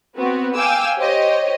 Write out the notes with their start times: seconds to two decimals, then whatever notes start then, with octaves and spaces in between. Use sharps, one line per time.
0.17 B3 C4 F#4
0.55 F5 G5 G#5 D6 E6
0.97 G4 C5 C#5 D#5